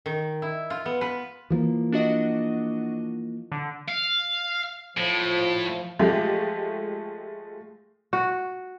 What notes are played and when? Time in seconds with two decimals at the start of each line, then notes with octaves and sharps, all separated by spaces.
0.06 D#3
0.42 E4
0.70 F4
0.86 B3
1.01 B4
1.50 E3 F3 A#3
1.92 D4 F#4 D#5
3.52 D3
3.88 F5
4.97 A2 F3
5.99 F3 G#3 A3 G4
8.13 F#4